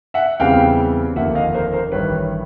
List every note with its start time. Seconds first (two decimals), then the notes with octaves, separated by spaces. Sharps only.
0.14 E5 F#5
0.40 E2 C#3 E3 G3 C4 F5 G5
1.16 F1 D#2 D3 F3 A#3 E5 F#5
1.35 D#5 F5
1.54 A#4 C5
1.72 A#4 C5
1.91 A1 G2 D#3 G3 B4 C#5